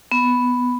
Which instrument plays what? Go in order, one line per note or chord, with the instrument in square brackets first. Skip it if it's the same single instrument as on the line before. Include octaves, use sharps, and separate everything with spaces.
[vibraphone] B3